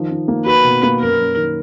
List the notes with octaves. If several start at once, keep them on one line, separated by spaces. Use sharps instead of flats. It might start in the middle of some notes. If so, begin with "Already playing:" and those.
Already playing: D#3 F3
D#3
A#3
F#4 B4
B2
A#3
F#2 A#4
F#2
D#3